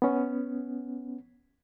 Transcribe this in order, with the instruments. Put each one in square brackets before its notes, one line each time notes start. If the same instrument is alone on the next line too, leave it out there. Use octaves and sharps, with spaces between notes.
[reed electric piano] B3 C#4